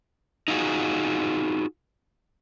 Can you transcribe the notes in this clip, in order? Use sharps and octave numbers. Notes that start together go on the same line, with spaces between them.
D#4 F4 F#4 G#4